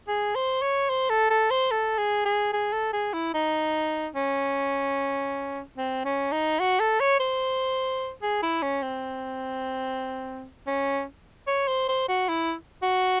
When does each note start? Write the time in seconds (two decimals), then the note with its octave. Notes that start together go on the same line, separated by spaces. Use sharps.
0.08 G#4
0.35 C5
0.62 C#5
0.90 C5
1.09 A4
1.30 A4
1.50 C5
1.71 A4
1.98 G#4
2.25 G#4
2.53 G#4
2.73 A4
2.93 G#4
3.14 E4
3.34 D#4
4.15 C#4
5.77 C4
6.05 C#4
6.32 D#4
6.60 F#4
6.80 A4
7.00 C#5
7.20 C5
8.22 G#4
8.42 E4
8.62 C#4
8.82 C4
10.67 C#4
11.47 C#5
11.68 C5
11.89 C5
12.08 F#4
12.29 E4
12.83 F#4